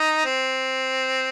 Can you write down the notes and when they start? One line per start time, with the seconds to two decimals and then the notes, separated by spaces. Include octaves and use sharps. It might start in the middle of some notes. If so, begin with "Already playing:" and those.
Already playing: D#4
0.26 C4